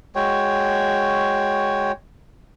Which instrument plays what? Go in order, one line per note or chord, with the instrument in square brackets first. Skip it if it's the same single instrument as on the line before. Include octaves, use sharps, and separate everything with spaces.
[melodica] G#3 F#4 C#5 G5